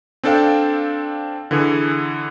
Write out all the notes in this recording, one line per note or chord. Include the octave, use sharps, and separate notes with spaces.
C4 D4 A4 D5 F5 G5
D3 E3 G#4